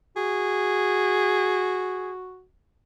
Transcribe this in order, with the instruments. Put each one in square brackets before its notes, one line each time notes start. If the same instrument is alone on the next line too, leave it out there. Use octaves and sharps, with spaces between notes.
[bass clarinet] F#4 [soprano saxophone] G#4